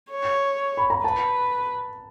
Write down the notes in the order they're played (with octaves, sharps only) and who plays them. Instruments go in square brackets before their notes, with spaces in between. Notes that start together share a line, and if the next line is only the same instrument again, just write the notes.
[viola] C#5
[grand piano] B5
A#5
[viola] B4 [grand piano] A5